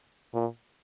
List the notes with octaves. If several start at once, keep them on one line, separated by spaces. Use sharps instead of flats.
A#2